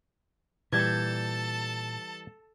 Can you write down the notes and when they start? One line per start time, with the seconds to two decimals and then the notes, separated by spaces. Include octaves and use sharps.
0.72 A#2 E3 G3 A4 A5 G6 G#6